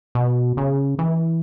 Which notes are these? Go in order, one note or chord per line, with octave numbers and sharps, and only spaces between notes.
B2
C#3
E3